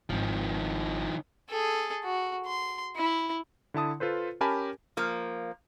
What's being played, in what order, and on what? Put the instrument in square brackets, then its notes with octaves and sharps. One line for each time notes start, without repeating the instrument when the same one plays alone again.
[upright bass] G#1 [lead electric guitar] D#3 F3
[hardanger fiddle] G#4 A4
F#4
C6
E4
[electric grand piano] D3 E4 A5 D#6
F4 A4 B4 C5
C#4 G4 A#4 G#5 A5 B5
[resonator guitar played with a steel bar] F3 A#3